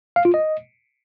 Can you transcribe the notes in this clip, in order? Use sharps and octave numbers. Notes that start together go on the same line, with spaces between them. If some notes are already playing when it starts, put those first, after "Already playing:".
F5
F4
D#5